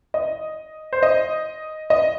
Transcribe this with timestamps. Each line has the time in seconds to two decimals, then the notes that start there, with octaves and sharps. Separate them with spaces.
0.14 D#5
0.93 C5
1.03 D#5
1.90 D#5